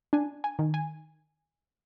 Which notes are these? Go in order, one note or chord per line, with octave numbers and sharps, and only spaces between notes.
D4 G#5
G#5
D#3
G#5